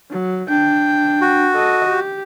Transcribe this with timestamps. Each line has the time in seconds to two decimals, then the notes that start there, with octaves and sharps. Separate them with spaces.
0.10 F#3
0.49 D4 G5
1.21 F#4
1.53 A4 D#5
1.88 G4